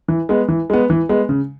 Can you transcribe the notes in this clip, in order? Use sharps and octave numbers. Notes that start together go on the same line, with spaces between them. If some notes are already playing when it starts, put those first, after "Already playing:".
E3
G#3 B3
E3
G#3 B3
E3
G#3 B3
C#3